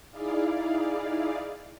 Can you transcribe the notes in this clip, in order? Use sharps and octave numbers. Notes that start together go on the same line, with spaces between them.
D#4 E4 G#4 D5 F5